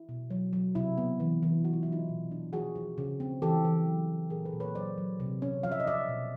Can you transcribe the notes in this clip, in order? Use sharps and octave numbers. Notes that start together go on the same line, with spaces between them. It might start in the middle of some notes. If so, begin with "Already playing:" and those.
Already playing: E4
B2
F#3
F#3
C3 E4
B3
E3
E3
F#3 F#4
F4
F#3 E4
D#4 F4
B2
D4
F3 F#4 G#4
F3
C#3
C4
E3 G4 A4
E3
F#3
F#3
A#2 G#4 A#4
A4 B4
A#2
B4 C#5
F#3 C5 D5
F#3
C3
C#4
F3 F5
E5
D#5
F3 D5 E5
B2